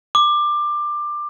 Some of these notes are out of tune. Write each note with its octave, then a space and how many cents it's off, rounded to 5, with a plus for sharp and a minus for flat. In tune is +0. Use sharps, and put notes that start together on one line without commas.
D6 +20